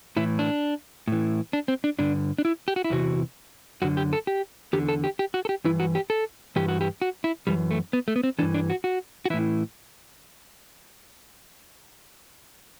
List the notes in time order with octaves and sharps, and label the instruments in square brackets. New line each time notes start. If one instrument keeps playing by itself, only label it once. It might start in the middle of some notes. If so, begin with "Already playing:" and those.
[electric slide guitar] A2 E3 E4
D4
A2 E3
D4
C4
D4
G2 D3 D4
D4
E4
G4
F#4
E4
E2 C3 E3 F#4
F#2 D3 F#4
G4
A4
G4
E2 D3 G4
A4
G4
G4
F#4
A4
G4
G2 E3 E4
F#4
G4
A4
G2 E3 G4
F#4
G4
F#4
E4
F#2 E3 G3
A3
B3
A3
B3
C4
E3 D4
G2
D4
F#4
F#4
F#4
E3 E4
A2